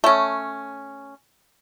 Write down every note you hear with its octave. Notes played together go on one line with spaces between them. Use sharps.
A3 C#4